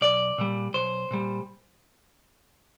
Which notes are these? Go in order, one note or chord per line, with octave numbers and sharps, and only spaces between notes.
B1 D5
A#2 G3
B1 C5
A#2 G3